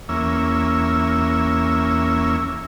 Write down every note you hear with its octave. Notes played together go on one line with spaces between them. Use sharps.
E2 A#3 C#4 E5